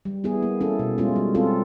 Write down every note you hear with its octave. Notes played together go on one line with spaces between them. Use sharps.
G3
B3 E4 G#4
A#3
C#4 E4 A4
B2
G#3 C#4 F4
G3
C4 F4 A4